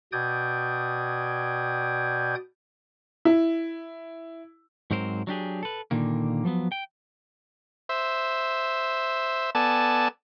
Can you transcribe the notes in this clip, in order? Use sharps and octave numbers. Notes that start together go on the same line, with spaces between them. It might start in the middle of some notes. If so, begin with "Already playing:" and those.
B2 D5 G5 D#6 G6 G#6
E4
G#2 F#3 C4 A#4 C5
F#3 D4 G4 G#4
A4 B4
A#2 D3 D#3 A#3
F3 F#3 B3
G5
C5 E5
B3 A4 D5 G#5 A5